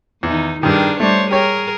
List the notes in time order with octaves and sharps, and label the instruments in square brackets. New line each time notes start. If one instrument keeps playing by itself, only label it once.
[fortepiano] E2 [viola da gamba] D#3 D#4
[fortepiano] G2 D#3 [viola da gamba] D4 G#4 A#4
[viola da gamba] G3 C5 C#5 [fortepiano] A3 D4
[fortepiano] G4 C#5 [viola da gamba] G#4 A#4